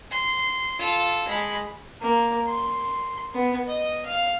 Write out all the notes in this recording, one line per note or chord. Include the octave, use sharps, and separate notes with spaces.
C6
F4 A4
G#3 B5
A#3
C6
B3
D#5
F5